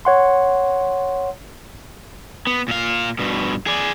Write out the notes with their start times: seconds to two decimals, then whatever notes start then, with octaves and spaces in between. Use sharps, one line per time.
0.05 C#5 F#5 C6
2.47 B3
2.68 A#2 F5
3.19 G2 B2
3.67 G#4 D5